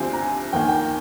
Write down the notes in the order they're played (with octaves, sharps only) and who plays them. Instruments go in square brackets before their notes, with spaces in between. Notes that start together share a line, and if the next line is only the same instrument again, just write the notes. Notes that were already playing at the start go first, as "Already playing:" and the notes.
Already playing: [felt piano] D2 D3 F3 C4 G4 [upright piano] G#5
[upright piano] A#5
G#5
[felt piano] D#2 D#3 A#3 [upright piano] G5
[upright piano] G#5
G5